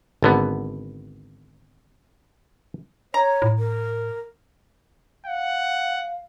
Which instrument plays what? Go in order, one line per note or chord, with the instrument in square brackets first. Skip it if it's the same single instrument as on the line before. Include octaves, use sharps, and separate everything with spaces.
[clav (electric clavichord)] G#1 D3 B3
[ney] C#5 [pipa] A#5
[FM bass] A2
[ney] A#4
[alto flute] F5 [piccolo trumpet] F#5